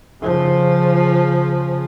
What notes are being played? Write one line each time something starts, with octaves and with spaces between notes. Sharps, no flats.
C#3 F3